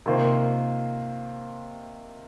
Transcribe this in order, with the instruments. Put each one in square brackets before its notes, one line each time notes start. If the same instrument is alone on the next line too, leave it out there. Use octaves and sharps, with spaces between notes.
[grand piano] C3 D#3 A#3 F4 C5